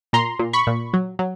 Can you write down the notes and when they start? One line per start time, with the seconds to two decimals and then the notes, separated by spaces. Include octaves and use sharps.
0.13 A#2 A#5 C6
0.39 A#2
0.53 B5 C#6
0.67 A#2
0.94 F#3
1.19 F#3